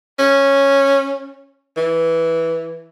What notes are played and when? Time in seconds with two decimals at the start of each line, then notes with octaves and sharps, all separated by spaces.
0.19 C#4
1.77 E3